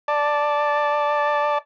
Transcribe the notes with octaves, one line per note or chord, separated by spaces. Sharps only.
D5 A5